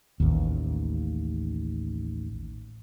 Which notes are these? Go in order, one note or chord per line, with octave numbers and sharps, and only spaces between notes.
A1 D#2